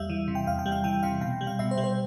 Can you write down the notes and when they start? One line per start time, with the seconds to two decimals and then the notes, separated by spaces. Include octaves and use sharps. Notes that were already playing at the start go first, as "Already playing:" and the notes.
Already playing: E2 G3 E5 F5
0.10 E3
0.28 C3
0.35 G5
0.47 E2 F5
0.59 G5
0.66 G3
0.72 F5
0.84 E3 G5
1.03 C3 F5
1.21 B2 G5
1.41 G3
1.47 F5
1.59 B2 E5
1.71 C5
1.78 G3
1.84 C5